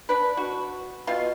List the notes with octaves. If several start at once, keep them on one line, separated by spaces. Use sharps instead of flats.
D4 B4
F#4
B2 F4 F5